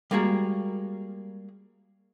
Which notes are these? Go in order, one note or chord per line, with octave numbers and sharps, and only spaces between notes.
G3 G#3 A#3 F#4 G#4 A#4